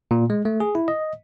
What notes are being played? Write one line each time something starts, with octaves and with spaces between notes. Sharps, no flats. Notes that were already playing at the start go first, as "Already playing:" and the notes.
A#2
G#3
A3
G#4
E4
D#5